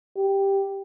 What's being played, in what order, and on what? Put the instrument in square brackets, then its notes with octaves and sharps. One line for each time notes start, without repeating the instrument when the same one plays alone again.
[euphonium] G4